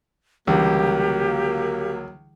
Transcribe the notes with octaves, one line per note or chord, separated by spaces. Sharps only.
C#2 D3 E3 F#3 G3 A#3 G4